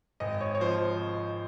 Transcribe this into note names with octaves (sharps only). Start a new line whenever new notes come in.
G#1 D#5
C#5
C#5
F3 C5